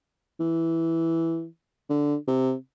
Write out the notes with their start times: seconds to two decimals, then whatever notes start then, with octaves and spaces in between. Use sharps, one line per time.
0.40 E3
1.90 D3
2.28 C3